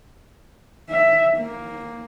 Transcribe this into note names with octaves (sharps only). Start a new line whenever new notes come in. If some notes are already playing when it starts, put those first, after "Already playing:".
E5
A#3